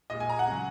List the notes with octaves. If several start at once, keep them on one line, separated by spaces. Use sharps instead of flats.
A#2 G#3 D#5
G#5
A#5
F#5
C#3 F#3